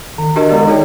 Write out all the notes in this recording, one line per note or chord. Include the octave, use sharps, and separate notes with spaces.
D#3
D4 F#4 G4 A#4 D#5
D#3 G#3 B3 D5
D#4 G#4 C#5 G5